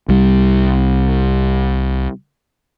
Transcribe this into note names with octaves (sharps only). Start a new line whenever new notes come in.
C2 G3